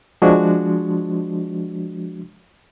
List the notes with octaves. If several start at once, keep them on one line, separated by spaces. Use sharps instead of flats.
F3 G#3 D4 F#4